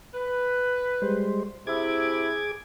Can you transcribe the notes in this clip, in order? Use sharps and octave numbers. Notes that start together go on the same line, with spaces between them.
B4
G3 G#3 C5
C3 E4 G#4 D6 G#6